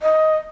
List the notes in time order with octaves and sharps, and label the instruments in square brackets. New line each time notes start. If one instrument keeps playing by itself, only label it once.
[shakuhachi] D#5